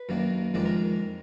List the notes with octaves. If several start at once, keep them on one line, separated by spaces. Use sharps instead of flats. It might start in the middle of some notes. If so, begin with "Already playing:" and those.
Already playing: B4
F#2 D#3 A#3 D4
F2 D#3 G#3 D4 D5
A#4